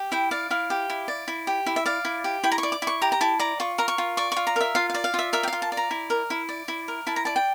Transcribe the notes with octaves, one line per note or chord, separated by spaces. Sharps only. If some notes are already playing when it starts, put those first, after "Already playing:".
Already playing: G4
E4 G5
D5 F5
E4 F5
G4
E4
D5
E4
G4
E4
E5
D5 F5
E4
G4
E4 G5
A#5
C#6
D5
D6
E4
C#6
G4 A#5
A#5
E4 A5
D5 A#5
F4 C#6
A#4 A#5
C#6
F4
D5 C#6
F4 C#6
A#5
A#4 E5
F4 F5
F5
D5
F5
F4 E5
A#4 E5
G5
F4 F5
A5
D5
A#5
E4
A#4
E4
D5
E4
A#4
E4 A5
A#5
D5 A5
G5